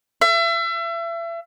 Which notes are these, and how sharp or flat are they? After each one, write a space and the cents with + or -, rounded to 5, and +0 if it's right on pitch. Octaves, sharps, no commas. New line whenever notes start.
E5 +35